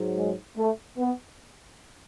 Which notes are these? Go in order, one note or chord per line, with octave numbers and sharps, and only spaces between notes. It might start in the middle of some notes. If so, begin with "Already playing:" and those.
Already playing: G#2 F#3
G#3
A3
B3